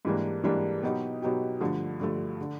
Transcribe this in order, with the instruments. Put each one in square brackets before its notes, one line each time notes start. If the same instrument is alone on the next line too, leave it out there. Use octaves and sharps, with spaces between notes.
[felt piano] G#2 E3 G3 A#3 D4
G#2 E3 G3 A#3 D4
B2 F#3 B3 D#4 G4
B2 F#3 B3 D#4 G4
G2 D3 F3 A3
G2 D3 F3 A3
D3